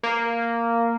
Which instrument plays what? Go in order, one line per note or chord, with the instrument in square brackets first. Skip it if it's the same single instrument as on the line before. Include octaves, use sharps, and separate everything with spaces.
[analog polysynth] A#3